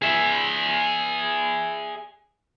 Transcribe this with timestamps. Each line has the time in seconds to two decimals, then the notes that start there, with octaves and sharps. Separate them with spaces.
0.02 G#4 E5